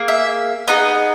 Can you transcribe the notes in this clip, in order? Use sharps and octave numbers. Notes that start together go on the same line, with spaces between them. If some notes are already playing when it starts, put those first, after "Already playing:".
Already playing: A#3 G#4
E5
B3 D#4 G#4 D#5